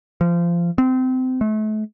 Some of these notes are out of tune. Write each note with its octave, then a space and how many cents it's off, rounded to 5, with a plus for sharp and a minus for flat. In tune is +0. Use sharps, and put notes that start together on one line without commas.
F3 -25
C4 -25
A3 -35